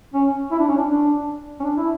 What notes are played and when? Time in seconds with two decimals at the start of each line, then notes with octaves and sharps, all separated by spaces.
0.14 C#4
0.51 E4
0.59 D4
0.68 C#4
0.77 D4
0.88 D4
1.60 C#4
1.64 D4
1.77 E4